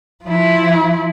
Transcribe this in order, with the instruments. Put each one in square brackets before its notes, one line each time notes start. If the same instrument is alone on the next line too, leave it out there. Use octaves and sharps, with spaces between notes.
[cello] F3 E4